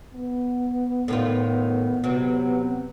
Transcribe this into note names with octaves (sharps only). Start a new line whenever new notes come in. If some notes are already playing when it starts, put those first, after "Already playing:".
B3
A2 D#3 F4
C3 F#3